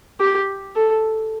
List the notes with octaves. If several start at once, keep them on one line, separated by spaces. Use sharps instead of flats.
G4
A4